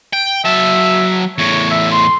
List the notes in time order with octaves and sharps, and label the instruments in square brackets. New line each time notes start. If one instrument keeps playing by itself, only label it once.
[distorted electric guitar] G5
[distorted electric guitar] F#3 A5 [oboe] E5
[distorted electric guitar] E2 A2 [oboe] C#5
[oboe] E5
C6